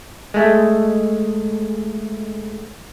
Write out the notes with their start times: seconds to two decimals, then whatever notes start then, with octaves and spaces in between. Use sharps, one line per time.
0.34 G#3 A3